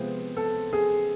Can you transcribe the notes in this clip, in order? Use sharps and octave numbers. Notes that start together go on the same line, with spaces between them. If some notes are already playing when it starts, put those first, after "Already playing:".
Already playing: C3 F3 G#3 B3 C5
A4
G#4